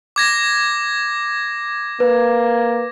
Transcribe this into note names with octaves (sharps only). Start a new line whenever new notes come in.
D6 G#6 A#6
A#3 B4